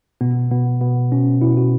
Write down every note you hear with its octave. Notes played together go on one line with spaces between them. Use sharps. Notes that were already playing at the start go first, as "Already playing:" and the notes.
B2 B3
B2 B3
B2 B3
B2 C#4
B2 E4
F#4